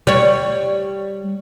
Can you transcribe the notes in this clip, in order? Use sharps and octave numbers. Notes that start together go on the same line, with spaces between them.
G3 C#5